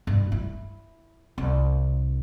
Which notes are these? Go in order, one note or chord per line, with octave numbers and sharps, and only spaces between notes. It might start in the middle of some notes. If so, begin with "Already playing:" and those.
G2
E4
C2